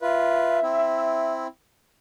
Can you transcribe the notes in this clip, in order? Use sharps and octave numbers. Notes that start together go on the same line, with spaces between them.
F4 B4 E5
C4 E4